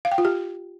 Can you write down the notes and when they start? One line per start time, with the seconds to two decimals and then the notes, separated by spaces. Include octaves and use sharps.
0.05 F5
0.12 G5
0.18 F4
0.25 G4